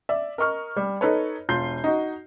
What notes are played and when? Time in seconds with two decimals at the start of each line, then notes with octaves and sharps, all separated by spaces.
0.09 D5 E5
0.38 A#4 D#5 C#6 F6
0.76 G3
1.01 D#4 A4 B4 C#5
1.49 E1 F4 G6 C7
1.84 D#4 F#4